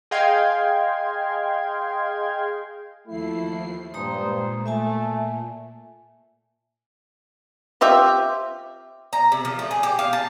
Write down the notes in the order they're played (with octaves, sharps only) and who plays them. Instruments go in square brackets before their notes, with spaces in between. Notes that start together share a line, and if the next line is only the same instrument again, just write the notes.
[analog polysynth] G#4 D#5 F5 G5 C6 G#6
[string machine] D#2 F3 C7 [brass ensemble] A3 E4
[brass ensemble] G2 C5 [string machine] A#2 [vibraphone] G#3 A#5 D#6
[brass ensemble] A3 [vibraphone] E5 G#5 A5
[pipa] C4 F4 G4 E5
[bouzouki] A#5
C3
F3
A3
G#4
G4
F5
A5